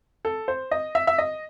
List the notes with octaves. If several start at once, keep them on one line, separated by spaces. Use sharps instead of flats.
A4
C5
D#5
E5
E5
D#5